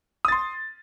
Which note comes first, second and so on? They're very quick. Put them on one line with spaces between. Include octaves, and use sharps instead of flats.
D#6 A6 C6